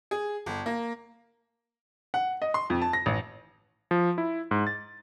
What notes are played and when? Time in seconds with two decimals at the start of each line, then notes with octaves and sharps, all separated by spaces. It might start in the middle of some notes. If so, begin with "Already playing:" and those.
0.11 G#4
0.46 G1
0.66 A#3
2.14 F#5
2.42 D#5
2.54 C6
2.70 F2
2.82 A5
2.93 A#6
3.06 A1
3.91 F3
4.18 E4
4.51 G#2
4.67 A6